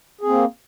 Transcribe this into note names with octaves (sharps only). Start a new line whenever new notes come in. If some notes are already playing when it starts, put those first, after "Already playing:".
A#3 C4 G#4